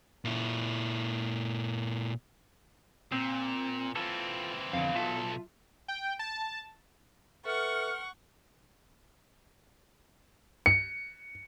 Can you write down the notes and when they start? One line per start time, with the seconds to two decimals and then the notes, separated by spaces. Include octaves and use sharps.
0.25 A#2 E4
3.12 A#2 C4
3.96 E3 C4 F4 A4
4.73 F2 B2 D3 F5
4.96 B1 F4 A4 E5 A5
5.88 G5
6.19 A5
7.45 A4 B4 E5 F#5 C#6 F6
10.66 C#7